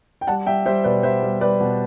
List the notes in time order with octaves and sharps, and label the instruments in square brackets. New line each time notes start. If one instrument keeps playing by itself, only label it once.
[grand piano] G5
G3 F#5 A5
G3 E5 G5
G3 C5 E5
B2 B4 D5
G3 C5 E5
G3
G3 B4 D5
B2